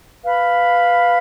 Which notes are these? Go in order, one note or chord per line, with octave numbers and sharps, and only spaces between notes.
B4 F5 B5